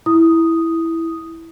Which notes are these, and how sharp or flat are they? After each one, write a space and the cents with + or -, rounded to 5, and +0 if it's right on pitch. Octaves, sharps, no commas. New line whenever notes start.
E4 +0 D#6 +0